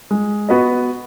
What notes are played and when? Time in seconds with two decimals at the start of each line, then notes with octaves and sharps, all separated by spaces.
0.11 G#3
0.49 B3 F#4 B4 D#5